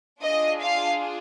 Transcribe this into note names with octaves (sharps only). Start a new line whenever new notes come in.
D4 F4 G#4 D#5
F5